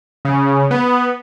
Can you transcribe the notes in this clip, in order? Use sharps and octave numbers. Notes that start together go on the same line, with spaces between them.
C#3
B3